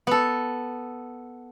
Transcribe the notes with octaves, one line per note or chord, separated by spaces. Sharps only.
B3 A4